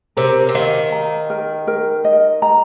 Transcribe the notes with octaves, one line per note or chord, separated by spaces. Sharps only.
C3 A#4
C3
D#3 F5
A#5
A#4
A#4
D#5
A#5